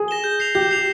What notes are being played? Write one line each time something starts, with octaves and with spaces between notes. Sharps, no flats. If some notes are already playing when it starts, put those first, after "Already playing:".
Already playing: G#4
A#6 E7 G7
G6
C7 F7
G4 G6
C7 F7